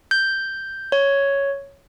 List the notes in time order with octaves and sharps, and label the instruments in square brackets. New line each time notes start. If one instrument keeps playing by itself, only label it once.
[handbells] G6
C#5